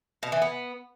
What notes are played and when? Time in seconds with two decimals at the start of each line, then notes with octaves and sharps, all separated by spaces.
0.23 B2
0.32 E3
0.42 B3